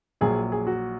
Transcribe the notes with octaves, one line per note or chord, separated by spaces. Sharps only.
A#1 A#2 F#3 G#4
G#4
F#4